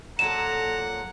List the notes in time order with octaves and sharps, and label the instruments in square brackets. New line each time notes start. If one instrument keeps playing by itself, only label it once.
[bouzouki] A#2 F#3 A4 [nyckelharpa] F#5 [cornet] A#5 [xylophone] E7